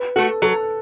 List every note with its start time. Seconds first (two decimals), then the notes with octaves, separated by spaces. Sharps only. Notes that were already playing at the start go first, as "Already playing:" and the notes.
Already playing: B4
0.16 A3 F#4 A4
0.42 F#3 A4